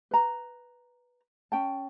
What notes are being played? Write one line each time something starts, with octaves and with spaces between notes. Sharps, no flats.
B4 A#5
C#4 G5 A5